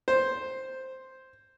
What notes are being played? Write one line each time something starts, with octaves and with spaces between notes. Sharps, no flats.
C5